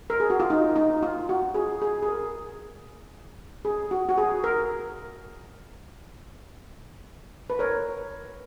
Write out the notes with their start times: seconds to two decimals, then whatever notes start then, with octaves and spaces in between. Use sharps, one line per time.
0.10 A#4
0.20 G#4
0.30 F#4
0.40 F4
0.50 D#4
0.76 D#4
1.03 F4
1.29 F#4
1.55 G#4
1.82 G#4
2.03 G#4
2.08 A#4
3.65 G#4
3.91 F#4
4.09 F#4
4.18 G#4
4.44 A#4
7.50 B4
7.59 A#4 C#5